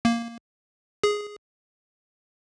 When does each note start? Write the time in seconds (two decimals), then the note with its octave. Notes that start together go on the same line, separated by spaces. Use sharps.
0.05 A#3
1.04 G#4